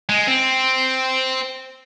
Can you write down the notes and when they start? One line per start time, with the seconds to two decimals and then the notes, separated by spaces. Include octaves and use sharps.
0.09 G#3
0.28 C4